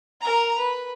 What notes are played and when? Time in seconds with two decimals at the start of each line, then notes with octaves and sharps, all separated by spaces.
0.21 A#4 A#5
0.58 B4